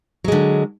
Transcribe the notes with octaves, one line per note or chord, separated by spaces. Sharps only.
D3 F#3 G#3